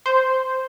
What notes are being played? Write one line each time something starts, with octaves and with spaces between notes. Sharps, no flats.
C5